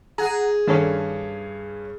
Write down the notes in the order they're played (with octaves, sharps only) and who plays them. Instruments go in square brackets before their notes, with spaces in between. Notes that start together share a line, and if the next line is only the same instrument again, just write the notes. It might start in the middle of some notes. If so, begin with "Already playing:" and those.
[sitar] G#4 [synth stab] F#5 A#5
[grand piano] G2 C#4 [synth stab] D#3 D4 A4